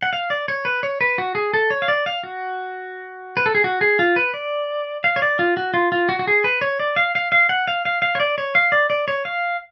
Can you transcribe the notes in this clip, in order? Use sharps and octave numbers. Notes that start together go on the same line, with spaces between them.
F#5
F5
D5
C#5
B4
C#5
B4
F#4
G#4
A4
C#5
F5
D5
F5
F#4
B4
A4
G#4
F#4
G#4
F4
B4
D5
F5
C#5
D5
F4
F#4
F4
F4
F#4
F#4
G#4
B4
C#5
D5
F5
F5
F5
F#5
F5
F5
F5
C#5
D5
C#5
F5
D5
D5
C#5
F5